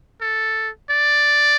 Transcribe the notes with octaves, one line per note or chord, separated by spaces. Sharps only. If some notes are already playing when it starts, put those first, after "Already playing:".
A4
D5